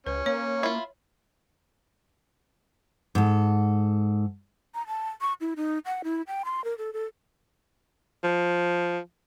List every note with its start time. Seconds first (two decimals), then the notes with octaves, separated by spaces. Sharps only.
0.06 C#2 C#4 B4
0.26 A#3 C#5
0.63 E4 F4
3.15 G#2 A4
4.75 A#5
4.87 A5
5.21 C#6
5.41 E4
5.56 D#4
5.85 F#5
6.04 E4
6.27 G5
6.45 C6
6.64 A#4
6.78 A4
6.93 A4
8.24 F3